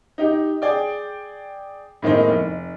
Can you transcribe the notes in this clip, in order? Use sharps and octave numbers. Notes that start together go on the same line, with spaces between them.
D#4 G4
G#4 D5 G5
A2 D#3 G#3 A#3 C4 D#4
F1